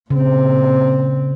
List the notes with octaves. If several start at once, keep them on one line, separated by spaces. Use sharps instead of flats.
A#2 C#3 C4